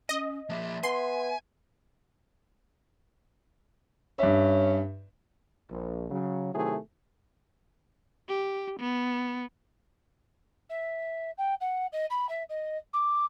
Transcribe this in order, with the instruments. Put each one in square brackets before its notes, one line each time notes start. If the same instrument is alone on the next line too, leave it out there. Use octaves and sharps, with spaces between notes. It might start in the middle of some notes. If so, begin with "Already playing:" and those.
[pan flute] C#4 [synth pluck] D#5
[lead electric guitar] F3 A#3 [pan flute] E5
[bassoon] B3 [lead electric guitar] G#5 [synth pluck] C6
[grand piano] G2 E5 [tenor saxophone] C#4
[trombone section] A#1
C#3 F#3
C3 D#3 F#3 A3 E4 G#4
[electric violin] G4
B3
[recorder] E5
G5
F#5
D#5
B5
E5
D#5
D6